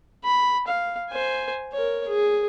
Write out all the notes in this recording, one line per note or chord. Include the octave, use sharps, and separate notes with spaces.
B5
F5
C5 G#5
A#4 C#5
G#4